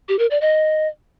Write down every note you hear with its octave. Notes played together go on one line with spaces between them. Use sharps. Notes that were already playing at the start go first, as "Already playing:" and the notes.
G4
A#4
D5
D#5